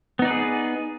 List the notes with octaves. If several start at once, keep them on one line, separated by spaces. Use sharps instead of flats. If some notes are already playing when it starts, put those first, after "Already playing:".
B3 D#4 G#4 B4 D5